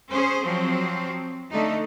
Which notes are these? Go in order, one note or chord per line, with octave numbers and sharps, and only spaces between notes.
C#4 G#4 C5
F3 F#3 C4
D3 A3 D#4